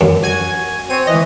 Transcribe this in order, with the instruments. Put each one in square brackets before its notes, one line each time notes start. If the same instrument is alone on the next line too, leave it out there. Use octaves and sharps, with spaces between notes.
[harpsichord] F#2
[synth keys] F#4 G#5 G#6
[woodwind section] C4 C#5 [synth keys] D#7
[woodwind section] E3 [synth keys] D#5